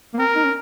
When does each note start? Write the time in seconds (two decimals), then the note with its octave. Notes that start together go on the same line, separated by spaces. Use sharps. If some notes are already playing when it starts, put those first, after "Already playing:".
0.13 A#3
0.18 C4 A#4
0.35 D#4
0.44 C#4